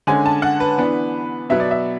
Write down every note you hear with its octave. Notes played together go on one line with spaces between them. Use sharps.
D3 G#3 C#4 G#5
A5
F#5
B4
E3 B3 D4
B2 F#3 B3 E5
D5
E5